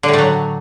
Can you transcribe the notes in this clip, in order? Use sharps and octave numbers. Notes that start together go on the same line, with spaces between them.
D3
A2
A3
F#3